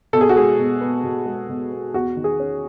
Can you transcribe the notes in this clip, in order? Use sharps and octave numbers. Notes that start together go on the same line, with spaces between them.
B2 A4
G#4
F#4
G#3 G#4
B2
B3
B2
G#3
B2
B3
E2 F#4
D#3
G#4
C#4